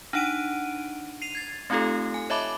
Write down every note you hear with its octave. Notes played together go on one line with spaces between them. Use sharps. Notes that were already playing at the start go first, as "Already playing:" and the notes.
D4 D#4 F#5 D7 D#7
C7 D#7 F7
G#6 A6
A3 C4 D#4 F4 G4 A4
G#5
C#5 D#5 E5 A5 B5 D6